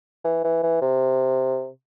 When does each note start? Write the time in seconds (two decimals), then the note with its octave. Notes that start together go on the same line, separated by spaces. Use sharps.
0.24 E3
0.44 E3
0.63 E3
0.82 C3